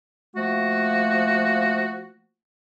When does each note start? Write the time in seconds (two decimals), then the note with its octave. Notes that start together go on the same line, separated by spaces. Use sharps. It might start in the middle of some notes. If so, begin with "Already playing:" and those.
0.36 F3 A3 A#3 F#4